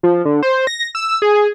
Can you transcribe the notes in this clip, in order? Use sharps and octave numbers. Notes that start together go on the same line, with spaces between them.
F3
D3
C5
A#6
E6
G#4